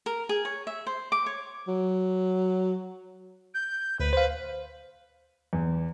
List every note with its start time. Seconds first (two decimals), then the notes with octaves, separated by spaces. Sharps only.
0.06 A#4
0.29 G#4
0.45 C#5
0.67 E5
0.87 C5
1.12 D6
1.26 C#5
1.68 F#3
3.54 G6
4.00 D2 B4
4.13 C5 F5
5.53 E2